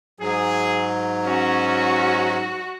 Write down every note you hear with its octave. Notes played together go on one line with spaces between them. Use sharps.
G#2 F#3 G#4
C#4 F#4